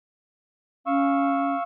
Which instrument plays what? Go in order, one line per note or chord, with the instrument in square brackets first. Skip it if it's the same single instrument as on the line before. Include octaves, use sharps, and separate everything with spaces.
[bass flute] C#4 [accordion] F5 C#6 E6